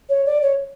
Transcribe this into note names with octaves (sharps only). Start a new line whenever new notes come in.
C#5
D5
C#5